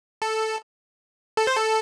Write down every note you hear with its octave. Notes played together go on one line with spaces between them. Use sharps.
A4
A4
C5
A4